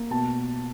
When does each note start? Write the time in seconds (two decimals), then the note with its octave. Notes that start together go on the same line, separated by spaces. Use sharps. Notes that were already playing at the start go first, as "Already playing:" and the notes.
Already playing: A#3
0.11 B2 A5